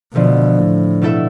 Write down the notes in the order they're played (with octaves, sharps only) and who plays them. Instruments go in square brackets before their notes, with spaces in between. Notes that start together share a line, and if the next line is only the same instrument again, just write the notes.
[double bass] B2 [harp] D3 F3 A3
[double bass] A2
[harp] B2 A3 E4 A4 E5